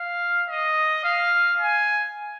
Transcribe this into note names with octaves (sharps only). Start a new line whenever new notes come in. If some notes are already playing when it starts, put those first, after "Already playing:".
Already playing: F5
D#5
F5
G#5